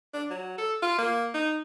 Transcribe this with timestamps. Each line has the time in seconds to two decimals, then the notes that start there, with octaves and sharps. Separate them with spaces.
0.14 D4
0.30 F#3
0.58 A4
0.82 F4
0.98 A#3
1.34 D#4